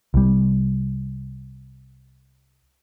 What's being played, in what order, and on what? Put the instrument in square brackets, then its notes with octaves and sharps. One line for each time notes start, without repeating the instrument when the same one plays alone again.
[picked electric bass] C2 G3